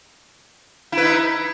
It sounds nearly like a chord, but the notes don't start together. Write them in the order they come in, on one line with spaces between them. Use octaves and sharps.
E4 B4 D#4